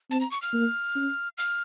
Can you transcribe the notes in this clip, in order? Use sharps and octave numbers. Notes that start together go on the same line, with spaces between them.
C4 A5
A#5
C#6
F6
A#3
C#4
F6